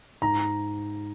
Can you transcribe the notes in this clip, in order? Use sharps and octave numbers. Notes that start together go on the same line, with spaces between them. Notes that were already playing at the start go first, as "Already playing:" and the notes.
G#2 A#5